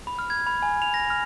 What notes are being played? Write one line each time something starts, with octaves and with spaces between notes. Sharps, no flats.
B5
F6
G#6
B5
G#5
F7
A#6
F6